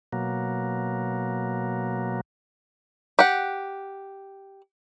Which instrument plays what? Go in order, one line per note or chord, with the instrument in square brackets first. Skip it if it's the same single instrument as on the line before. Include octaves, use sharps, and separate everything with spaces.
[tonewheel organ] B2 F#3 A#3
[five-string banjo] G4 F#5